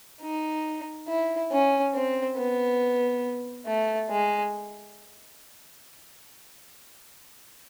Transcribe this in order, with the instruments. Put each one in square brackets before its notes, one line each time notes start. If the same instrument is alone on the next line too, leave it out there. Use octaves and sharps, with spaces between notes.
[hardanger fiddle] D#4
E4
C#4
C4
B3
A3
G#3